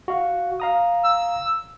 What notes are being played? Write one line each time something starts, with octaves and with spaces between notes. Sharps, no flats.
F#4 F5
F5 A#5 D#6
E6